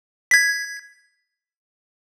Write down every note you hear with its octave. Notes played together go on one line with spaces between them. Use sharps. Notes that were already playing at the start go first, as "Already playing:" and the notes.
G#6 B6